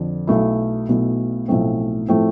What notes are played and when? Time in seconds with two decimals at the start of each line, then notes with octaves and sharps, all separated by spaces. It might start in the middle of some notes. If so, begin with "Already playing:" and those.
Already playing: F2 D3 F3
0.27 B1 B2 A3 E4
0.88 B1 B2 A3 E4
1.48 B1 A2 F3 A3 C4
2.08 A2 F3 A3 C4